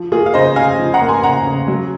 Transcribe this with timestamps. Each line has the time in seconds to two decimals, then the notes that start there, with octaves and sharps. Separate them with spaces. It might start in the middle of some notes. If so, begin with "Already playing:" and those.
Already playing: F3
0.12 A#3 F4 G#4
0.26 F5
0.34 C#3 C5 D#5
0.56 C#3 F5 G#5
0.79 F3
0.94 F#5 A#5
1.01 A#3
1.09 G#5 C6
1.23 C#3 F#5 A#5
1.46 C#3
1.68 F#3